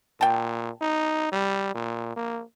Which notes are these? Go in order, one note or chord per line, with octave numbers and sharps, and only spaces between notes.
A#2 G5 A5
D#4
G3
A#2
A#3